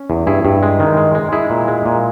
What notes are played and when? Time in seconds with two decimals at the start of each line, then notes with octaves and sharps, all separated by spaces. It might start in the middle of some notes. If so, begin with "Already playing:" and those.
Already playing: C#4
0.10 E2
0.27 G2 E4 G#4
0.45 G2
0.63 G#3
0.80 D#3
0.97 G#3
1.15 G#3
1.32 G#3 E4 G#4
1.50 A#2
1.68 G#3
1.85 A#2